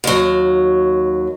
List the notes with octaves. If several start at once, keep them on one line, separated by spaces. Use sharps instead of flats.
D#2 F#3